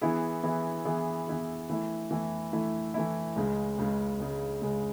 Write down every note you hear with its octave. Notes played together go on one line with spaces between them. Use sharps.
E3 B3 E4 G#4
E3 B3 E4 G#4
E3 B3 E4 G#4
E3 B3 E4 G#4
E3 A3 E4
E3 A3 E4
E3 A3 E4
E3 A3 E4
C#2 C#3 G#3
C#2 C#3 G#3
C#2 C#3 G#3
C#2 C#3 G#3